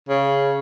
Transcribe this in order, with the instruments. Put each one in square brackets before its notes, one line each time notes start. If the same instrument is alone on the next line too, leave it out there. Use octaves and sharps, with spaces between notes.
[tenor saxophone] C#3